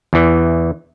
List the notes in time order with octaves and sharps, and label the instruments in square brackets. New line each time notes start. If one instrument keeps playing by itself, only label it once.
[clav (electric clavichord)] E2 E3